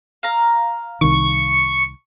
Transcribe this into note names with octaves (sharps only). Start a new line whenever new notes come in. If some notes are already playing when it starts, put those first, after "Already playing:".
F5 A#5
C2 D#3 C#6